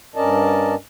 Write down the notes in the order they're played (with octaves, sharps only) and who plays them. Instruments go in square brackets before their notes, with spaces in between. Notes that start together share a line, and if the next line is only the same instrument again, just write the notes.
[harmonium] G2 C#4 A#4 D5 D#5 A5